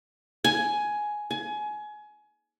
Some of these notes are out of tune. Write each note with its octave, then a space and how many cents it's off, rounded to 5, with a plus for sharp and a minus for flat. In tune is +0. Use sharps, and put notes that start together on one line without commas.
G#5 +10
G#5 +25